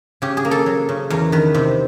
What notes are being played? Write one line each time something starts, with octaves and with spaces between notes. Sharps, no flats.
C#3 G4
G#4
A#3
A4
F#3
C#3
E2 A#4
D#3 B4
C3 C5